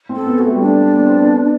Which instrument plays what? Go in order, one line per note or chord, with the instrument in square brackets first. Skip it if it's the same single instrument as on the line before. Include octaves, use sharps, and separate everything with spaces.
[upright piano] C4
[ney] A4
[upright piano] B3
[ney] F#4
[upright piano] A3
G3
[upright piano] A3 [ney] D4
[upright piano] B3
C4
B3